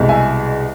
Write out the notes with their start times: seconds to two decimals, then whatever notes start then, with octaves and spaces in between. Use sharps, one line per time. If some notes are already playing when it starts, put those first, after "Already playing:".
Already playing: C2 B2 G#3
0.09 E5 G#5